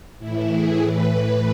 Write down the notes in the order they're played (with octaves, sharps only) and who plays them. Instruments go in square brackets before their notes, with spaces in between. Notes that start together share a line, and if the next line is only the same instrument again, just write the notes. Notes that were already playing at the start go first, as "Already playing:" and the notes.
[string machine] A2 E3 E4
G#4
A2 E3 B4